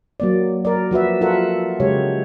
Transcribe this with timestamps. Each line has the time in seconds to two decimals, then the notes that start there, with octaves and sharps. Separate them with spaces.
0.20 F#3 A#3 D5
0.65 A#4 D5
0.91 F3 F#4 B4 E5
1.21 F4 A4 A#4 E5 F#5
1.80 C#3 G#3 G4 C#5